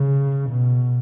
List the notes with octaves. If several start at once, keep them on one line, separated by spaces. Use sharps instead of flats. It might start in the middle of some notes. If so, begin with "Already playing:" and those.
Already playing: C#3
B2